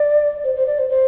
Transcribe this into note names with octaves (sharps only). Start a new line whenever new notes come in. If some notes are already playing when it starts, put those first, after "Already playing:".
Already playing: D5
C5
C5
D5
C5
C5